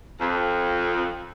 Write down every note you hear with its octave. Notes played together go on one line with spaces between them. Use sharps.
F2